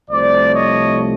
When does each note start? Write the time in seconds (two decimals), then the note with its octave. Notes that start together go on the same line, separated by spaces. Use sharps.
0.11 C2 C3 F3 A3 C5 D5
0.54 C#5 D#5